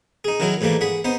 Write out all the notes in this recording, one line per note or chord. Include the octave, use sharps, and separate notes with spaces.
D#4 G#4
D#3 F#3 E4 G#4
G#2 E3 G3 A3 A#3
G#4 F#5 B5
B3 D#4 C5